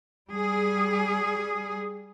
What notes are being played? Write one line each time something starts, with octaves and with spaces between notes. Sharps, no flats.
G3 G#4